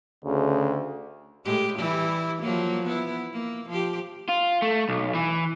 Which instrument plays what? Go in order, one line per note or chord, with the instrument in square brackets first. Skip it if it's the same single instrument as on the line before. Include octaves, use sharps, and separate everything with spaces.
[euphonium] D2 [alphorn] C#3
[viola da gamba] A2 G#3 G4
E3 G3 E4
F3 F#3 A#3
B3 E4
A#3
F3 G4
[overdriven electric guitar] F4
A3
B1
E3